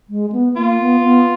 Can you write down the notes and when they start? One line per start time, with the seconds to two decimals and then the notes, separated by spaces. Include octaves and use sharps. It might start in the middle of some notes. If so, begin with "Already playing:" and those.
0.09 G#3
0.32 B3
0.56 A#3 F4
0.80 B3
1.03 B3